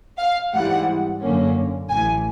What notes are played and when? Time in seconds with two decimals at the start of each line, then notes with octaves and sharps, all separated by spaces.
0.19 F5
0.54 G#2 E3 G3 C4 F#5
1.21 F#2 D3 F#3 A#3 C#4
1.90 A1 A2 E3 G#5